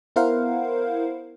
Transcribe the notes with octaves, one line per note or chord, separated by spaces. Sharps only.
B3 E4 A#4 C5 F5 F#5